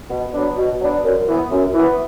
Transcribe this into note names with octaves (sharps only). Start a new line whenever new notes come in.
B2
F#3 B3 D4
B2
F#3 B3 D4
F#2
E3 B3
F#2
E3 B3